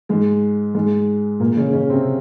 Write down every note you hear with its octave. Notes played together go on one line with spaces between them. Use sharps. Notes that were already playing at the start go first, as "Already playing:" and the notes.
G#2 G#3
G#2 G#3
A#2 A#3
C#3 C#4
C#3 C#4
C3 C4